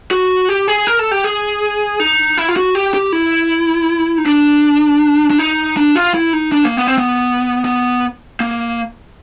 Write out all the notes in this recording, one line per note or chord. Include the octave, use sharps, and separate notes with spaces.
F#4
G4
G#4
A#4
A4
G4
G#4
D#4
E4
F4
F#4
G4
G4
E4
D#4
D4
D4
D#4
D4
F4
E4
D#4
D4
A#3
B3
C4
B3
B3
A#3